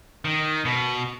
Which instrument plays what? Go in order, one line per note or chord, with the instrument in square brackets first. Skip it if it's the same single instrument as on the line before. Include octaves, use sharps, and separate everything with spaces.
[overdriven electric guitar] D#3
B2